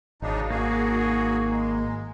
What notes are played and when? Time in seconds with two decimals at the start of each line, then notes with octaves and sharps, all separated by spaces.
0.22 G#1 C#3 D4 D#4
0.51 A#3 F#4 G#4
1.51 G#3